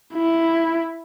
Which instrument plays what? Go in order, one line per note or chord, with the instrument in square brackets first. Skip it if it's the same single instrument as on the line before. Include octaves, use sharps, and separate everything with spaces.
[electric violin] E4